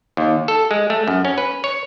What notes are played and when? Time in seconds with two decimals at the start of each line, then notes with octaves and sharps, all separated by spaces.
0.17 D#2
0.48 A4
0.71 G#3
0.90 A3
1.08 F#2
1.25 C#4
1.38 B4
1.64 C#5